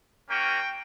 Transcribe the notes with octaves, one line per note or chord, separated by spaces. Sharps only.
A#3 C#4 F#4 G5